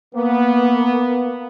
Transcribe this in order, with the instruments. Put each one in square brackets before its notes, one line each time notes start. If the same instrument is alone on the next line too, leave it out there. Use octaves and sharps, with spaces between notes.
[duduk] A#3 [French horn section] B3